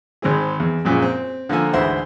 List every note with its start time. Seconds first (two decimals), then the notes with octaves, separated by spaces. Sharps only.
0.22 G#1 G#3 C4 G#4
0.60 E2
0.85 F#2 A#2 F3 G#3 C#4
1.02 C4
1.49 D3 F3 A#3 A4 G#5
1.73 D2 G#2 E3 C5 E5 F#5